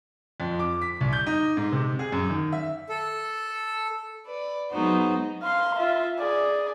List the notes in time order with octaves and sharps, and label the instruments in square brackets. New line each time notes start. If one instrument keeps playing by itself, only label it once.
[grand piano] F2
D6
B6
C2
G6
D#4
G#2
C3
G#4
F#2
D#3
E5
[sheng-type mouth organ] A4
[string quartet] B4 D5
F#3 G#3 B3 D#4 F#4 C5
[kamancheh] F5 C6
F4 E5
G#4 D5